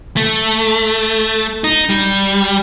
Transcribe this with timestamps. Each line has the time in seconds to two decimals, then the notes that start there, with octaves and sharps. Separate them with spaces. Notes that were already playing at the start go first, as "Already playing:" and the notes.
0.17 A3
1.64 D#4
1.89 G3